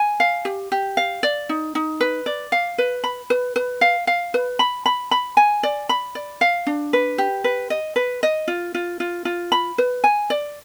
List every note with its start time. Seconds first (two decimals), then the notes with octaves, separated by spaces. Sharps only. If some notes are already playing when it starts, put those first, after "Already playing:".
Already playing: G#5
0.20 F5
0.45 G4
0.72 G4
0.97 F5
1.23 D5
1.49 D#4
1.75 D#4
2.01 B4
2.26 D5
2.52 F5
2.78 B4
3.04 B5
3.30 B4
3.56 B4
3.81 F5
4.07 F5
4.34 B4
4.59 B5
4.86 B5
5.11 B5
5.37 G#5
5.63 D5
5.89 B5
6.15 D5
6.41 F5
6.67 D4
6.93 B4
7.18 G4
7.44 B4
7.70 D#5
7.96 B4
8.23 D#5
8.48 F4
8.75 F4
9.00 F4
9.25 F4
9.52 B5
9.78 B4
10.04 G#5
10.30 D5